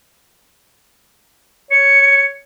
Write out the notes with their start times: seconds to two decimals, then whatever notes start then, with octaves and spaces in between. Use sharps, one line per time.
1.71 C#5 C#7